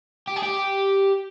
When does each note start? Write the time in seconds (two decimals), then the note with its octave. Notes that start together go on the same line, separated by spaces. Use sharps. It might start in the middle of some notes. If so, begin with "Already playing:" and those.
0.28 G4
0.36 G#4
0.43 G4